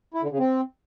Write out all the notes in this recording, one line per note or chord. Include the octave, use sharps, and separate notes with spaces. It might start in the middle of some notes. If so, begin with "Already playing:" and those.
E4
D3
C#3
C4